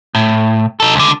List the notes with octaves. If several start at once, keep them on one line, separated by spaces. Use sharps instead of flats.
A2
D#4 A4
C#2 D3